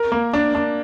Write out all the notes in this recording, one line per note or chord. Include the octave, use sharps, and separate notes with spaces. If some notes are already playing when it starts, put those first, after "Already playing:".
Already playing: A#4
A#3
D4
D4